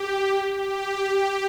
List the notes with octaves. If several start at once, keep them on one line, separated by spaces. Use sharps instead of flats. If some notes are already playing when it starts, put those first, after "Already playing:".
Already playing: G4
G4